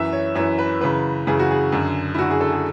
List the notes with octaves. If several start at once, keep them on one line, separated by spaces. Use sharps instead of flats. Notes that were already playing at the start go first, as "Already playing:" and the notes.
Already playing: F#2 E3 E5
C#5
F#2 E3 C#5
B4
F#2 C#3 E3 B4
F#2 C#3 E3 G#4
F#4
G#4
F#2 D3
E4
F#2 D3 F#4
G#4
A4
G#4